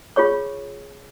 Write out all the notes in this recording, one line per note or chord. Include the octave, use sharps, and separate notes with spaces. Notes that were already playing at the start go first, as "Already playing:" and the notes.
F4 G#4 C#5 C#6